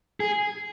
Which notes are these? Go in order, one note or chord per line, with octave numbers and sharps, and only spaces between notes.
G#4